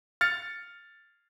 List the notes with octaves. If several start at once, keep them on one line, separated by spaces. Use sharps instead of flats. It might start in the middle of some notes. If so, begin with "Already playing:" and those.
F6 A6 C#7